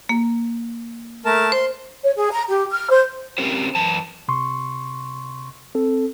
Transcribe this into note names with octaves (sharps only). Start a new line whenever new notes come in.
A#3
A3 A#4 A5
C5 C6
C#5
G#4
A#5
G4
F6
C5
C4 C#4 G4 A#4 C5
F#2 E3 A5
C3 C6 C#6
C4 A4